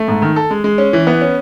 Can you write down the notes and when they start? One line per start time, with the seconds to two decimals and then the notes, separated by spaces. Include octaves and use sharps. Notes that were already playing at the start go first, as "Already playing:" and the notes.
Already playing: A3
0.08 G#2
0.22 D#3
0.36 A4
0.51 G#3
0.64 G#3
0.78 C#4
0.93 E3
1.07 B3
1.21 C#4